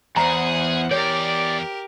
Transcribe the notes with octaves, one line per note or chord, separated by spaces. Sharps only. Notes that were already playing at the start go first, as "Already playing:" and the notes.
E2 G#4 C5 F#5 A#5
E2 G4 A#4 C#5 D5